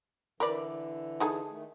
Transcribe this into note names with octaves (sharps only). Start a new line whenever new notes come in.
D3 E3 A#4 B4 D5
D#4 G#4 A4
D#3 A3